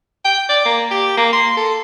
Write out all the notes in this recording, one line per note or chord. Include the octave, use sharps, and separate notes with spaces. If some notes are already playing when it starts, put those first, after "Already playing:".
G5
D5
A#3
G4
A#3
C6
A4